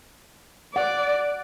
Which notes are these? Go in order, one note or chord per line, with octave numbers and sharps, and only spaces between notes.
D5 F#5